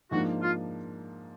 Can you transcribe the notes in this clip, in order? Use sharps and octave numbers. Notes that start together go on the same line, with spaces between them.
G#2 F3 A#3 D4 F#4
F4